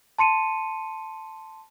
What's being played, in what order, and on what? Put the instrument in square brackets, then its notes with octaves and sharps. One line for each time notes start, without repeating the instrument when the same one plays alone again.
[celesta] A5 C6 C#7 D#7